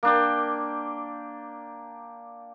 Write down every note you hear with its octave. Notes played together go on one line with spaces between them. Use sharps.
A#3 D4 G5